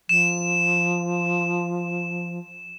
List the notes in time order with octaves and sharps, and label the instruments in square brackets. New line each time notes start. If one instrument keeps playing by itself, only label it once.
[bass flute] F3 [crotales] E7